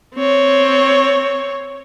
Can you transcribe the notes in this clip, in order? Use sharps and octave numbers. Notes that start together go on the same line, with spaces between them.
C4 C#5